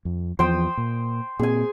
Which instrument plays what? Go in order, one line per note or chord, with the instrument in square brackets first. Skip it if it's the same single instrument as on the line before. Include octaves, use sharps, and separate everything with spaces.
[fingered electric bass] F2
[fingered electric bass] E2 E3 F3 [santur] C5 G5 D#6
[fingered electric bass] A#2
[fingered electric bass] A#2 C4 [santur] G#4 G#5